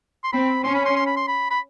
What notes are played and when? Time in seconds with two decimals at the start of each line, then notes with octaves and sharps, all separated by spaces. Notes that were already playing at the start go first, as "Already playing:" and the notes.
0.24 C6
0.32 C4 B5
0.64 C#4 C6
0.75 B5
0.86 C6
0.96 C6
1.06 B5
1.17 C6
1.28 B5
1.50 B5